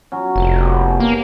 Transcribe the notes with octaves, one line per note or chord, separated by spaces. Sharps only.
F#3 C#4
F1
B3 G4
A#3